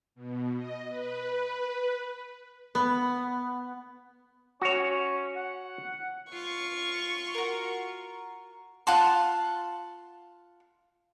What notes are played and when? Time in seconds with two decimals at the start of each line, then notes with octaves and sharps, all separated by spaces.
0.15 B2
0.58 D#5
0.89 B4
2.75 B3
4.62 C#4 F#4 C#5
5.36 F#5
6.33 F4 C#6
7.34 F#4 A#4
8.87 F4 F#5 A5 C6